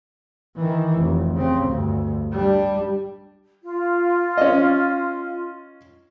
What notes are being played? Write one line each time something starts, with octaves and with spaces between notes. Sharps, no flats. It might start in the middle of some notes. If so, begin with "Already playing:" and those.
D#3 E3
F1
C#3 C4
D2 G2
G3 D4
F4
C#4 D#5